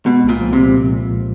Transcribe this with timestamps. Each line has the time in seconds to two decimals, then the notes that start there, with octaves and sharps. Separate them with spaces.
0.06 B2 G#3
0.24 C2
0.29 A#2
0.40 F3
0.53 C3
0.58 A#2